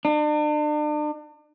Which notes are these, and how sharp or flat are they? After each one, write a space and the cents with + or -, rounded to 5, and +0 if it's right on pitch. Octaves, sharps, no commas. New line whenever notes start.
D4 +40